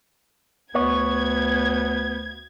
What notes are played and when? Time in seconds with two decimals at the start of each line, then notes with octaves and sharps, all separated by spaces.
0.75 D2 B3 C#5 G#6